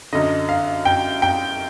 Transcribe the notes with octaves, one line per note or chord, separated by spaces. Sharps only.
F#2 D3 D#5
F5
G5
G5